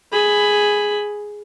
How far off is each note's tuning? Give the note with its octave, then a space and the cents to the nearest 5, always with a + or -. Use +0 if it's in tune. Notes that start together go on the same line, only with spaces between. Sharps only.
G#4 +0 B5 +10